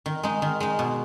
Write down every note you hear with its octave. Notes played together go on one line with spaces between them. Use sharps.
D#3
G#3 D#4
D#3
G#3 D#4
B2